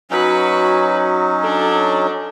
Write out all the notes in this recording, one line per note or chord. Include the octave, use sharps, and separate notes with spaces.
F#3 C#4 D#4 F#4 B4
D4 A4